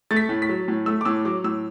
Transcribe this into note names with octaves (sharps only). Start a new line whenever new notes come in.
A3 A6
B6
A2
B6
F#3
A2
A3 E6
D6
A2 E6
F#3 D6
A2 E6